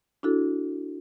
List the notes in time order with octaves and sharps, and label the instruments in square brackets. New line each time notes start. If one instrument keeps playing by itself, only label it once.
[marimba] D4 E4 F#4 A4